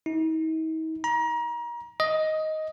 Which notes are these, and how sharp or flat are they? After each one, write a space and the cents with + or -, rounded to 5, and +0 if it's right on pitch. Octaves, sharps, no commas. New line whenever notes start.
D#4 +45
A#5 +30
D#5 +10